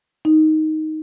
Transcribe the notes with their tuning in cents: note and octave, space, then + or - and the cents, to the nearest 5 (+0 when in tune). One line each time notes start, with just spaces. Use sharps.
D#4 +5